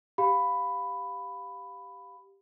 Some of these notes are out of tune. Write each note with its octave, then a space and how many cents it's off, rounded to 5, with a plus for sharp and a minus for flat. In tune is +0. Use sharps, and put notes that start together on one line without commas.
G4 +0 F5 +15 B5 +10